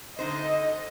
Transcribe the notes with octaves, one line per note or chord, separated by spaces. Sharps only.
D3 D#4 C5 D#5